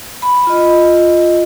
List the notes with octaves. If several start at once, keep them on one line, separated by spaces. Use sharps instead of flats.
B5
F4 D#5